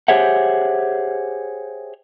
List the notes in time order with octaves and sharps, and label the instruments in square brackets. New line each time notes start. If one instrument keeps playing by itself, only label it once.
[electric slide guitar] G4 G#4 C5 C#5 E5 F#5